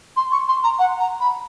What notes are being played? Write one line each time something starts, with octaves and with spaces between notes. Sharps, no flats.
C6
C#6
C6
A#5
F#5
A#5
B5